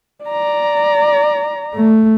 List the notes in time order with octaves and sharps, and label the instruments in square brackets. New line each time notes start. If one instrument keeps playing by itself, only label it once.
[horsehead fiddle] D5 A#5
[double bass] A3